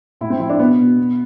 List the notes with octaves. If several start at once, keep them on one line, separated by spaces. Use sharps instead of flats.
A2 E4
C4
F3 E4
D4
B2 B3
B2
B2